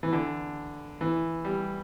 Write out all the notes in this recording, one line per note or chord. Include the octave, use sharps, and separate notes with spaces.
E3
D3
E3
G3